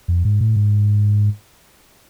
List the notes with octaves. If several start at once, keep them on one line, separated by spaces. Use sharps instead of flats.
F2
G#2
A2
G#2